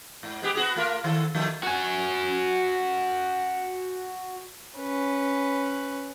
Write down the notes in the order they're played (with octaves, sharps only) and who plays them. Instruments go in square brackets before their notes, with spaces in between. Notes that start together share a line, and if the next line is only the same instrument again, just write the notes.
[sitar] G#2
G#3 B3 G4
B3 F#4 G#4
A3 F4 A#4
D#3 A4
D#3 F3 A3
[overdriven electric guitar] F#4 G#5
[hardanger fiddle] C#4 B4